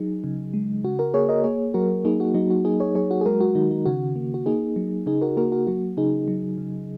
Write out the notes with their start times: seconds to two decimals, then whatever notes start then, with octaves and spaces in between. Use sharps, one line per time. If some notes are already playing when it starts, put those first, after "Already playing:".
Already playing: F#3 D#4 G#4
0.24 C#3
0.54 G#3
0.84 C#3 F#4
0.99 F#4 A#4
1.14 A#3 G#4 C#5
1.29 A#4 D#5
1.44 A#3 G#4 C#5
1.74 F#3 F#4 A#4
2.05 A#3 D#4 G#4
2.20 F#4
2.34 F#3 D#4
2.51 F#4
2.65 A#3 D#4 G#4
2.80 G#4 C#5
2.95 F#3 G#4 C#5
3.11 F#4
3.21 G#4
3.25 G#3 F#4 A#4
3.41 F#4
3.55 D#3 D#4
3.71 D#4
3.86 C#3 F#4
4.16 A#3
4.34 F#4
4.46 A#3 D#4 G#4
4.76 F#3
5.06 C#3 D#4 G#4
5.21 F#4 A#4
5.37 A#3 F#4 A#4
5.52 F#4 A#4
5.67 F#3 F#4
5.97 C#3 D#4 G#4
6.28 F#3
6.58 C#3